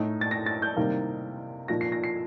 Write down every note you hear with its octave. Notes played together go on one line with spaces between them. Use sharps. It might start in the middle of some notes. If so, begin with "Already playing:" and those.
Already playing: A2 A3 D#4
A6
A#6
A6
G6
C3 D#3 G3 A#3 D#4
A#2 F3 A#3 D#4 A#6
C7
A#6
C7